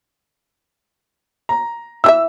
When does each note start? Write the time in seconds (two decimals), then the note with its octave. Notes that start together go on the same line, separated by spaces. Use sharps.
1.49 A#5
2.04 E3 F4 E5 E6